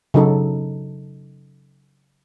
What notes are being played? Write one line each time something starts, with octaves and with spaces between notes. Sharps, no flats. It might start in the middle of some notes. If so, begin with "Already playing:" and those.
C#3 F#3 D#4 A4